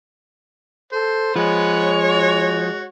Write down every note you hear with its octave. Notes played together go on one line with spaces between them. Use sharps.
A4 C5
F3 G#3 C#5 F#5 B5
F#4